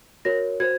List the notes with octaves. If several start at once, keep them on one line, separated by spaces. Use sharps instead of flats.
F#4 A#4 C#5 A#6
F#4 C5 G#6